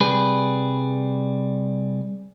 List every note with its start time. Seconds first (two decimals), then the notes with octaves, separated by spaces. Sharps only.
0.01 C2 G3 G#4 B4